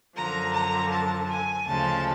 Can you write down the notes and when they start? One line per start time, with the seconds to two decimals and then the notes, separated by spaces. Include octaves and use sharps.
0.16 F#2 D3 F3 A#5
0.53 A#5
0.90 A5
1.28 G#5
1.65 D2 C#3 F3 G#3 A5